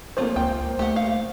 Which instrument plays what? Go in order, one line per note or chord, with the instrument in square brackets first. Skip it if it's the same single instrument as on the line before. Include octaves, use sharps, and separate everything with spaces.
[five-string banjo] F3 A3 C#5 [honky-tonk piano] A#3 C4 C5
[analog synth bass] C#2 [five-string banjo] G5
[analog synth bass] A3 [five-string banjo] G4 F#5
[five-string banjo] F5